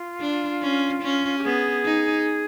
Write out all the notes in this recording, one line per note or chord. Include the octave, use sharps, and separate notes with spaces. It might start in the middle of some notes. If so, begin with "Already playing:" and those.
Already playing: F4
D4
C#4
C#4
G4
B3 G#4
D#4